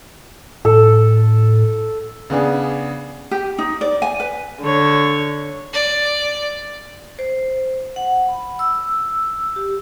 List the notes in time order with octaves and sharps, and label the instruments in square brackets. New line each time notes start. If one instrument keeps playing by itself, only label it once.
[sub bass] A2 [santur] A4
[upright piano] C#3 B3 D4 G#4
[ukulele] G4
D#4
D5
G#5
B4
[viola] D3 C#5
[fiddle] D5
[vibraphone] C5
F#5
B5
E6
G4